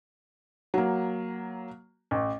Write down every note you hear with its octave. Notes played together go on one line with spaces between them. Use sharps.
F#3 A#3
A1